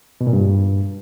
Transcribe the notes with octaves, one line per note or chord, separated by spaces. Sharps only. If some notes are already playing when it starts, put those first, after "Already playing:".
B2
A#2
G2